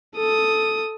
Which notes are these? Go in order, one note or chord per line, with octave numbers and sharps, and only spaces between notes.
A4 D#6